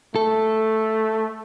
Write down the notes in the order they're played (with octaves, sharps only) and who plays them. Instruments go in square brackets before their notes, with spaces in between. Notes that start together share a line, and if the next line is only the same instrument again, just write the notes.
[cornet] A3 [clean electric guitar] A4